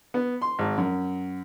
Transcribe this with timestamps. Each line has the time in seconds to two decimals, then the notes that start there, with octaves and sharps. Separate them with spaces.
0.14 B3
0.42 C6
0.59 G#1
0.78 F#2